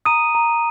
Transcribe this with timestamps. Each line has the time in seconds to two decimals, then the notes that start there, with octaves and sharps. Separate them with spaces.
0.05 A#5 D#6 D#7
0.35 A#5